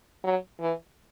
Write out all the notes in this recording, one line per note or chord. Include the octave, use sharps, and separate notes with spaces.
F#3
E3